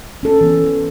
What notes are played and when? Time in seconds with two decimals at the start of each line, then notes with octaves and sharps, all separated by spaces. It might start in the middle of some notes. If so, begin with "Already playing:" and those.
0.23 C#4 A4
0.41 E3 B3